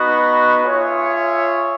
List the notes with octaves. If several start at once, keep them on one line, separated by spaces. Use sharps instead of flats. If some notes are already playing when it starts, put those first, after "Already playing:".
Already playing: B3 D#4 F#4 B4 D#5
F4 G#4 C#5 E5